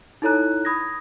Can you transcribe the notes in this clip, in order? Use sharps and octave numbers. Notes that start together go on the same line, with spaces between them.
D#4 E4 A4 C#5 A#5 F#6
B5 D#6 G#6 A#6